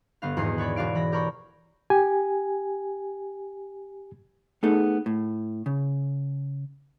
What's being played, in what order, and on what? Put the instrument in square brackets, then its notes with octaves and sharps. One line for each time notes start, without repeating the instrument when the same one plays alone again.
[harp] G1 B3 F5
D#1 E2 G#2 F#4 D#6 C7
B4 C#5 D5 B5
E1 F#4 D5 F5 D7
E3 B5 A#6
G4 A#4 C#5 B5 C#6
[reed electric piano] G4 G#5
[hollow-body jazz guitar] A3 B3 D#4 G#4 A4
A2
C#3